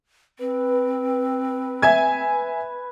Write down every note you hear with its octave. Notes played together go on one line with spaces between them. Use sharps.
C4 B4
E5 G#5 G#6